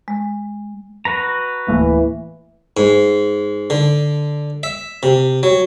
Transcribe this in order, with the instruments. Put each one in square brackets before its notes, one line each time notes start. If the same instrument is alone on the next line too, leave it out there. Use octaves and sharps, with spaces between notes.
[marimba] G#3
[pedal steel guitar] F#4 B4 A#5
[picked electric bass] D1 A3 A#3 [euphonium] E3
[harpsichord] G#2
D3
E5
C3
F#3